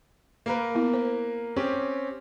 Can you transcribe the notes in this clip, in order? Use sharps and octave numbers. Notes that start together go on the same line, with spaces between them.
A#3 A#4 B4
B3 E4
C5
C4 C#4 G4